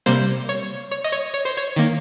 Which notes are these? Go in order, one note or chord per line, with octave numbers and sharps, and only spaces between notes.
C3 G3 A#3 C5
C#5
C#5
D#5
C#5
C#5
C5
C#5
D#3 A#3